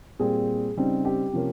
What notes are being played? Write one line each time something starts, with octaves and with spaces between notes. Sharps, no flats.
A#2 G3 C4 G#4
C#3 G3 C4 D#4
G4
C3 F3 A#3 C#4